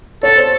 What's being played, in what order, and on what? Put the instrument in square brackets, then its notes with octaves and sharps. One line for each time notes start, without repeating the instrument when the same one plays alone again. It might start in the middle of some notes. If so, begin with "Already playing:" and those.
[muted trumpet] A4 [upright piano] C#5
[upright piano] C5